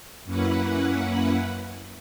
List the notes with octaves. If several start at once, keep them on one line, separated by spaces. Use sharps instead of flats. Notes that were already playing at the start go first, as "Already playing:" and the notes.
F#2 A#3 C#4 E4 B4 F#5